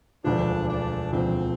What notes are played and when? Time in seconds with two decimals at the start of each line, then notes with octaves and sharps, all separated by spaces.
0.24 E1 D2 D3 F3 D4
0.69 D4
1.12 E1 D2 D3 F3 C4